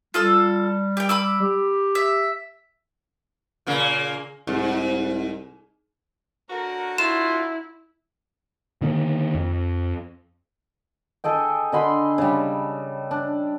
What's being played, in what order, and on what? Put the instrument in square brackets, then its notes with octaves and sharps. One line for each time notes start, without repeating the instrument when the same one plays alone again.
[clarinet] G3 [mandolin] F4 A4 E6
[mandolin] G4 G5
B5 D6 E6
[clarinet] G4
[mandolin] E5
[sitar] A#2 C#3 A#3
[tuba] C2 [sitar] G#2
[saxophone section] D3 C#4 F#4 [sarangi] A#4
[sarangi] E4 [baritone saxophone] F4 [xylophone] E7
[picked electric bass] D3 D#3 A#3
F2
[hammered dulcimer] G#4 A4 D#5 G5
D3 D#5 B5 C6
C#3 G3
D4